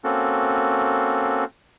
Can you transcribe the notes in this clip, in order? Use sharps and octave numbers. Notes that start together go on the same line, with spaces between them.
A#3 C4 C#4 F#4 A4